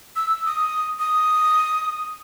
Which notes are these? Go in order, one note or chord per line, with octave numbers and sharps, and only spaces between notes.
E6
D#6
D#6